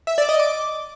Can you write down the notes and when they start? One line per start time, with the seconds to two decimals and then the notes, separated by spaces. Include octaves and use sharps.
0.07 E5
0.18 D5
0.29 D#5
0.40 D6